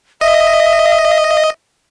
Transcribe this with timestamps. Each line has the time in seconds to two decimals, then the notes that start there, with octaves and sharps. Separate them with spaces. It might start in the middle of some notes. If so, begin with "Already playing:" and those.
0.21 D#5 E5